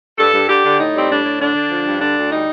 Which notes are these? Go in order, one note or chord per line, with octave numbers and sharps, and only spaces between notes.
G2 A4
G2
D3 G4
D3
A2 D#4
G3 C4
A2 D4
A2
D3 D4
D3
F3
G2
D3 D4
D2
G3 D#4